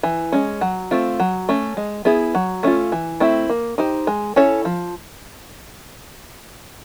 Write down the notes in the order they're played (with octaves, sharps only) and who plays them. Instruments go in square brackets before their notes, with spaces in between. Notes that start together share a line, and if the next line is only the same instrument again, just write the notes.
[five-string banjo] E3
G#3 C#4
F#3
A3 C4 F4
F#3
A3 C#4
G#3
B3 E4 G#4
F#3
A3 C#4 F4
E3
A3 C4 E4
A#3
D#4 G4 C5
G#3
C#4 E4 A4 C#5
F3